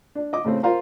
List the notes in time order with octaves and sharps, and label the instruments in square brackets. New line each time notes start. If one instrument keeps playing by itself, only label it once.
[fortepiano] D4
D#5 D6
A2 C#3 A3 C4
F4 A#4 C5 F5 A#5